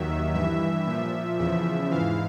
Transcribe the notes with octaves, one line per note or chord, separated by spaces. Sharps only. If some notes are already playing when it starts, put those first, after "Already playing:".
Already playing: D#2 D#3 F#3 E5
G2 E3 E5
A#2 F3 E5
E2 C#3 F3 E5
G#2 E3 F5